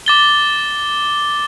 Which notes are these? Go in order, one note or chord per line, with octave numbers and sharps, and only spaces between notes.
D6 A6 G7